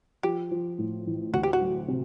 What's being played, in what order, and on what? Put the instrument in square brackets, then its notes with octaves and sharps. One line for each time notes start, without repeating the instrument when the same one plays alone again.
[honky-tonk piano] F3 [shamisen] G4
[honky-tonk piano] F3
A2
A1
[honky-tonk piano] D2 [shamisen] F#4
[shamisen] G4
F#4
[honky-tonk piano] F#3
C3